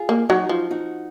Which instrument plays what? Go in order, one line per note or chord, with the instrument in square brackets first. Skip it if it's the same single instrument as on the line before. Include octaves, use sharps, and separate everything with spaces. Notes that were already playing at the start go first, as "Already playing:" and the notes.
Already playing: [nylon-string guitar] F4 G#4
[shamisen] A#3
[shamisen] F#3 [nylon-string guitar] D#4 F#4
[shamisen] F3
[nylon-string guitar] D#4 F#4